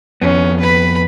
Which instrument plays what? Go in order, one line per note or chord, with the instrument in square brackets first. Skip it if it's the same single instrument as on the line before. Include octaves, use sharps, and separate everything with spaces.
[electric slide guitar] F2 B3 [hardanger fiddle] C#4
[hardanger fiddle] B4 B5